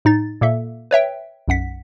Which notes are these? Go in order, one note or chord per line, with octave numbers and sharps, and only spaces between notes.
A2 D#4 A6
A#2 A#3 A4 E5
B4 C#5 E5 G5
B1 F#2 F#5 B6